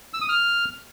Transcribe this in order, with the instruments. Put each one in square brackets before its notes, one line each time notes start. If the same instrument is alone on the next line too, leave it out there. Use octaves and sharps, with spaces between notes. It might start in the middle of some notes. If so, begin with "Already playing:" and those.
[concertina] E6
D#6
F6